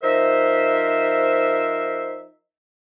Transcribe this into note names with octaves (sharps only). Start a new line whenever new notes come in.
F3 D#4 A#4 C5 E5